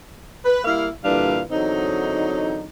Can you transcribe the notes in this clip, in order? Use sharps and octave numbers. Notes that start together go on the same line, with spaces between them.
B4
G3 A#3 E4 F5
A#2 D3 E3 G3 D4 F5
E2 D3 F#3 C4 D#4